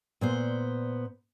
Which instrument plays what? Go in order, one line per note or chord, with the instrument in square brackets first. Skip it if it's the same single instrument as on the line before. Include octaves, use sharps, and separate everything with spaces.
[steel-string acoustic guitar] A#2 B3 C5